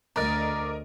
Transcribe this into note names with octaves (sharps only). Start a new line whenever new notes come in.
D2 A#4 D5 D#5 A#5